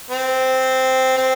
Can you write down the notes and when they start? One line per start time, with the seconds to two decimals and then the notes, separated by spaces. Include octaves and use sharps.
0.11 C4
1.17 C4